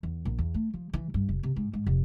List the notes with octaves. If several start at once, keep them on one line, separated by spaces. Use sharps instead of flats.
E2
A#1
E2
A3
F3
E3
G2
F1
C3
G#2
G#2
F1